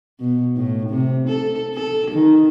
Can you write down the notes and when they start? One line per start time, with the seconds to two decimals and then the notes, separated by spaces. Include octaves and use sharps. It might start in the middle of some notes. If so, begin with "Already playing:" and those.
0.20 B2
0.57 A2
0.89 C3
1.28 A4
1.74 A4
2.11 D#3